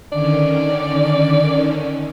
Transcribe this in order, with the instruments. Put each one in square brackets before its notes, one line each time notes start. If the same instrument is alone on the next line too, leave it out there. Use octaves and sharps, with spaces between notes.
[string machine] D3 D#3 C#4 [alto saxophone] D5